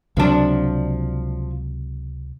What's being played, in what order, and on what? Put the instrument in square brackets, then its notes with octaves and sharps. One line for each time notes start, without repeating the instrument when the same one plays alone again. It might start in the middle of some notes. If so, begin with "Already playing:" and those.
[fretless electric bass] C#2 C3 F#3 [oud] F3 D4